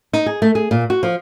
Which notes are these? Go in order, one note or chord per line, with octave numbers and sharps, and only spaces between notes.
D#4
G#4
A3
G#4
A#2
F#4
F3